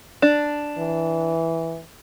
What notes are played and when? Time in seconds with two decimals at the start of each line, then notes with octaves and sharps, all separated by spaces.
0.22 D4
0.78 E3